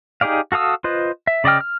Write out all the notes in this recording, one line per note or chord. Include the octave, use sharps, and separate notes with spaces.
D#4 G4 G#4 D5 F5
F#4 A4 F5 D#6 E6
F4 B4 C5 D#5
E5
C#3 D5 D#5 G5 F6
F6